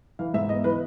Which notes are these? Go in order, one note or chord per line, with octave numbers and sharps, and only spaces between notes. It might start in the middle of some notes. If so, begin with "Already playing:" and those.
E3 F5
G#2 E5
B3 D#5
E3 B4